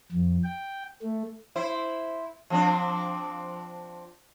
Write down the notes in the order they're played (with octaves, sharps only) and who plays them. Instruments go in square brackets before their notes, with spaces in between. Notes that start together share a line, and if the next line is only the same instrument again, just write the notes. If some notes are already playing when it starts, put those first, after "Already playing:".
[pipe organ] F2
G5
A3
[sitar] E4 C5
F3 C4 D4